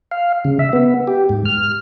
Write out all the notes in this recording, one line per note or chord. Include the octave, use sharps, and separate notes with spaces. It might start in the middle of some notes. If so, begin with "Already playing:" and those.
F5
C#3
E5
B3
G4
G#2
F6